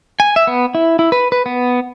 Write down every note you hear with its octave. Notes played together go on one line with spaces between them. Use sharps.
G#5
E5
B3
E4
E4
B4
B4
B3